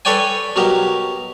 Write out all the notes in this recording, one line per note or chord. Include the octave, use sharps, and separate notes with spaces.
A4 B4 C#5 D5 G5 G#5
B2 F#3 G4 A#4